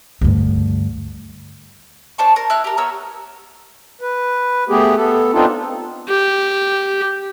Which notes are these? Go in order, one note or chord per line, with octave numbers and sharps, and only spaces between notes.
D2 G2
D4 C5 A5 C#6
A#4
E4 F6 F#6
G4 A#4
B3 A#4 C#5 E6
B4
A3 B3 G4 G#4
B3 A4
B3 C4 D4 D#4 F4 A4
G4